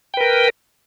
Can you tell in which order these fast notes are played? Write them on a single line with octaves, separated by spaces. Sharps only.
G5 B4 A#4